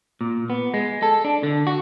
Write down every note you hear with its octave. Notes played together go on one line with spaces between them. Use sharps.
A#2
B3
G#3
A4
D4
D3
F#4